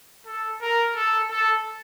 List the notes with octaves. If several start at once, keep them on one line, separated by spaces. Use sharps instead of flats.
A4
A#4
A4
A4